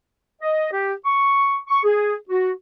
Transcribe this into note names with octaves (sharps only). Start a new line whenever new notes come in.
D#5
G4
C#6
C#6
G#4
F#4